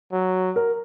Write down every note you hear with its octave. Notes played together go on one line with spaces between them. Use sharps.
F#3
A#4